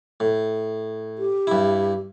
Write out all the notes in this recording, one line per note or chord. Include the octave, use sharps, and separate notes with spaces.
A2
G4
G2 E4